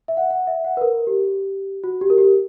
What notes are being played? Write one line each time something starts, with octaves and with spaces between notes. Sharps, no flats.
E5
F#5
F#5
E5
F#5
B4
A#4
G4
F#4
G4
A#4
G4